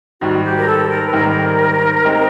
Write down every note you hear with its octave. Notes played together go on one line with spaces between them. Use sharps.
G#2 D#3 G3 F#4
G4
A#4
A4
A#4
B4
G#2 D#3 G3 A#4
G#3 C4 D#4 G4